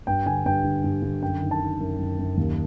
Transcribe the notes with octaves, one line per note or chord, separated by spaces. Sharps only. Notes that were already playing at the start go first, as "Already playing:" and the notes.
G2 G5
D3 G#5
G2 G5
D3
G2
D3
F#2 G5
D#3
A5
D#3
F#2
F#2
F#2
D#2